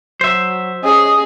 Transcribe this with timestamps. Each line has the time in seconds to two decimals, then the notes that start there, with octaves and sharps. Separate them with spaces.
0.21 F#3 C5 E5
0.84 C#4 G#4 D#5